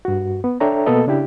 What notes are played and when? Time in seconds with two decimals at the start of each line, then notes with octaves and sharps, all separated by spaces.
0.05 G2 F#4
0.44 B3
0.60 D4 A4 C#5 E5 G5 A#5
0.86 B2 A#3 B3 A4 D#5
1.07 C#3 D4 E4 G4